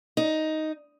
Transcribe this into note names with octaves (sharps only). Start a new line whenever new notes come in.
D#4